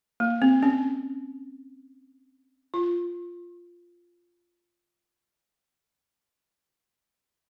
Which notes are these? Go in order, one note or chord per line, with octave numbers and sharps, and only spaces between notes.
A#3
C4
C#4
F4